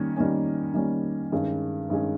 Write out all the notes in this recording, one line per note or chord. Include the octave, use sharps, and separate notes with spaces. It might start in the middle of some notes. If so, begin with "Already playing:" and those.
Already playing: D#3 G3 A#3 C#4
D#3 G3 A#3 C#4
D#3 G3 A#3 C#4
G2 D#3 G#3 C#4
G2 D#3 G#3 C#4